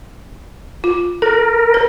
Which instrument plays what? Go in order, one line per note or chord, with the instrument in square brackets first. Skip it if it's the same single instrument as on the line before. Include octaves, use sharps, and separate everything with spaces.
[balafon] F4
[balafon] A4 [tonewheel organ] A#4
[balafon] B4